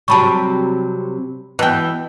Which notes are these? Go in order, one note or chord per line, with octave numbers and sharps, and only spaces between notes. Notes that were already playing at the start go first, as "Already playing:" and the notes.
C3 F#3 G3 A5 B5 C#6
B2 E3 B3 G5